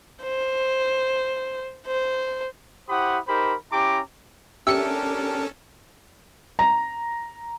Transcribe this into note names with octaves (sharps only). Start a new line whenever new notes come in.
C5
C5
E4 G4 C5 F#5 B5 D#6
D#4 G4 A#4 C5 B5
C#4 E4 G4 A#5 C6 D6
C#4 D4 G4 A4 A#4 E5 C#7
A#5